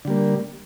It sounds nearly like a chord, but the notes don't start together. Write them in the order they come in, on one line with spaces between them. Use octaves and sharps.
D3 G3 A#3